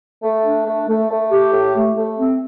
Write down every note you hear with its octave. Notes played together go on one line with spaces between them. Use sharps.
A3
D4
A3
A3
A3
G4
A2
A3
A3
C4